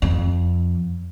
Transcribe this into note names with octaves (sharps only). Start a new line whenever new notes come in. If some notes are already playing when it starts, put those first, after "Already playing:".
F2